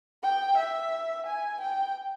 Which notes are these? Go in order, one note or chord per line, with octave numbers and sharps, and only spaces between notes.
G5
E5
G#5
G5